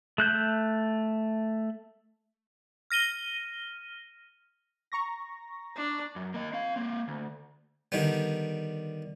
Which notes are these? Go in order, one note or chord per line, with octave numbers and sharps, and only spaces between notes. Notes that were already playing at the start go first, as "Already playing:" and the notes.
A3 F#6 G6
F6 A#6 D#7 G7
A#5 C#6 A#6
D4
F#2
A#3 D#5
C4 F5
A#3 C4
D2
D3 D#3 G3 B3